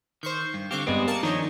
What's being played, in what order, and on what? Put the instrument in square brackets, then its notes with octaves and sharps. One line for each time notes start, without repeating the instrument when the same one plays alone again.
[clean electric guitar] D#3 [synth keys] C5 C#6 G6
[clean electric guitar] G2
[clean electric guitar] D3 C4 G4 [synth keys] F5 C#6 D6
[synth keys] G2 G#3 B3 [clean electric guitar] C4 G#4
[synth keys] A#3 A5 C#7
[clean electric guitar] D#3 F3 D4 [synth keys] D#4 C#5 D#5